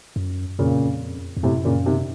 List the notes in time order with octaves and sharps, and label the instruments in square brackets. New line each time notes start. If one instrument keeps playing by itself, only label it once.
[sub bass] F#2
[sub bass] F2 [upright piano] A#2 C#3
[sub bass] F2
[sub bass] F#2 [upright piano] A2 C3
[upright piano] A#2 C#3
C3 D#3